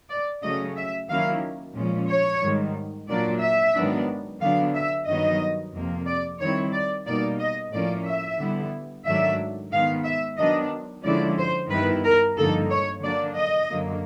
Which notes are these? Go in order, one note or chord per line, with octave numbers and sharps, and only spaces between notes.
D5
C#3 F#3 A3 C#4 D#5
E5
D#3 F#3 A#3 C#4 E4 F5
A#2 F3 G#3 C#4
C#5
G#2 D#3 G3
A#2 F#3 A#3 D4 D5
E5
G#2 D#3 F#3 B3 D4
D3 F#3 B3 D4 F5
E5
G2 D#3 F#3 B3 D#4 D#5
F2 C3 F3 A#3
D5
D#3 G3 C4 E4 C#5
D5
B2 G3 A#3 D#4 D5
D#5
A2 F3 A#3 C#4 D5
E5
D3 G3 B3 E4
G#2 D#3 F#3 A3 D4 E5
G#2 D#3 G#3 B3 F5
E5
D#3 F#3 B3 D4 D#5
D3 F3 G#3 C#4 E4 D5
C5
G2 D#3 G3 B3 E4 B4
A#4
G2 D3 F3 A#3 D#4 A4
C#5
D3 F#3 A#3 D4 D5
D#5
F#2 D3 F#3 A#3